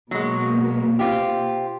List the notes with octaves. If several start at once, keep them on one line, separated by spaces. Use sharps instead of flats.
B2 F#3 G#3 A#3
C4 F4 G4